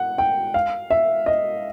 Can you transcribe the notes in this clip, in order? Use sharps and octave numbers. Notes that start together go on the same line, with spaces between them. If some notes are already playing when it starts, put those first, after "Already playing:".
Already playing: F#5
G5
F5
E5
D#5